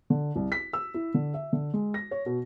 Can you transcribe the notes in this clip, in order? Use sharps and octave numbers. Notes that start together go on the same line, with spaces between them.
D3
C2
B6
E6
E4
D3
E5
D3
G#3
A#6
C#5
B2